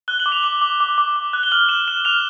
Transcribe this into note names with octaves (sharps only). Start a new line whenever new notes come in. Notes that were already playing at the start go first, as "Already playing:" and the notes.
F#6 G7
F#7
D6
F7
D6 F#7
D6
D6
D6
D6
F#6
G7
F6 F#7
F6 E7
F6 E7
F6 F7